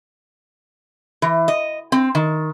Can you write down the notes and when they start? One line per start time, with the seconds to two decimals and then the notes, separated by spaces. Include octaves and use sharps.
1.22 E3
1.48 D#5
1.92 C4
2.15 D#3